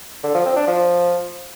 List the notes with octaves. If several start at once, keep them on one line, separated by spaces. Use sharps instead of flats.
D3
F3
C4
D4
F3